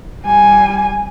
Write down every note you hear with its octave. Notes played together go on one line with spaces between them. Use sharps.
G3 G#5